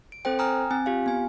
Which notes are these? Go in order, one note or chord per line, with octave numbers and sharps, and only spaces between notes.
D7
C4 A4 C5 G5
G5 G#5 A#5 D#6 F6
C4 G#5
F4 G4 F5
B3 G#5